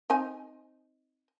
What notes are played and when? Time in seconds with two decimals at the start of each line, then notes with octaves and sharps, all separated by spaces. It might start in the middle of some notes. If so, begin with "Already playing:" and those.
0.10 C4 D#4 G#5